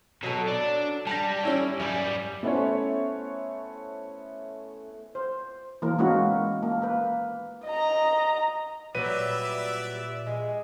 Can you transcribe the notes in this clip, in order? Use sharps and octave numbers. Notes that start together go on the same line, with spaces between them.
B2 F#3 A4
D4
G3 A5 A#6
C#4 E4 C#5
F#2 G3 G#5
A3 B3 C#4 E4 C5 C#5
C5
E3 A#3 A#4
G#3 A#3 B3 C#4 E4 F#4
A#3
A#3 B4
D#5 A#5
A#2 F#3 G3 B4 D5 E5 D#7
G#3